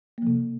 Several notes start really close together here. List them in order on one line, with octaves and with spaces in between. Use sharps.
A#3 F3 C3